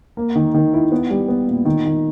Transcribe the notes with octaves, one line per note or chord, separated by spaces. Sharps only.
A#3
D#3
D#3
E4
B3
G3
B3
A#2
D#3
D#3